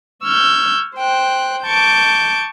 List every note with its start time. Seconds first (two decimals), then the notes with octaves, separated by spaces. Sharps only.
0.23 C#6 E6 F6 G6 G#6
0.97 C5 G5 F#6
1.64 A5 C#6 D6 G6